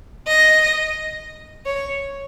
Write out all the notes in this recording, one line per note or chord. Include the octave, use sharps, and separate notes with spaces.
D#5
C#5